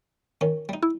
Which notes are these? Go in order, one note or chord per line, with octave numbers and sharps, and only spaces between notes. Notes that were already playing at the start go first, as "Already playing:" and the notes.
D#3 C#4
G3 D#4
E4